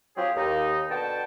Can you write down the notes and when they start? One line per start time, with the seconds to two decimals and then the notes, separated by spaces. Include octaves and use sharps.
0.17 F#3 C4 F4 G4 G#4 C#5
0.36 D#2 D#4
0.90 B2 D3 F#5 G5 A5